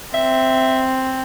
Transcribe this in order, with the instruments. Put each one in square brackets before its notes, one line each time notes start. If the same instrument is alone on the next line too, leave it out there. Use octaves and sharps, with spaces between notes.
[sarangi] C4 [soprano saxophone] E5